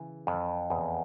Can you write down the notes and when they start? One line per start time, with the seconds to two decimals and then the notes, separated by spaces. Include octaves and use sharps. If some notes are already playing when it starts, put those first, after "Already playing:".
Already playing: C#3 E3
0.27 F2
0.70 E2